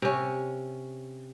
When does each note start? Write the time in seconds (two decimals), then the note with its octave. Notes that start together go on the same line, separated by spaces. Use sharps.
0.02 C3 C#4